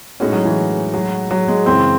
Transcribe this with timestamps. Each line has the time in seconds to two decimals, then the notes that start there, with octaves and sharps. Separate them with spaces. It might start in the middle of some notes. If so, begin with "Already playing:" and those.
0.20 A2 G#3 C#4 D#4 F#4
0.32 F#3
0.45 E3
0.93 F#3
1.31 F#3
1.48 G#3
1.66 F#2 C#3 E3 G#3 C4